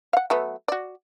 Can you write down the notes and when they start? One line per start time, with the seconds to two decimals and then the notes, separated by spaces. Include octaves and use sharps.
0.13 F5 F#5
0.30 F#3 A3 B3
0.68 F#4 D5